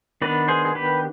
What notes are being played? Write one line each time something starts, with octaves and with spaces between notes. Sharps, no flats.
D#3 B3 D4 B4 D5
G#4 C5
G#4
G4 B4